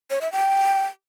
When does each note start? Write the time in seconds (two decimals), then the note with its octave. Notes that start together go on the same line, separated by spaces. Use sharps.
0.10 C#5
0.21 E5
0.32 G5